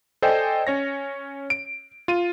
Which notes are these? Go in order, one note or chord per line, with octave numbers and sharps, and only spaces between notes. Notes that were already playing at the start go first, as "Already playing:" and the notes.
A4 C5 D5 D#5 G5 G#5
C#4 C#5 A#6
D7
F4 D#7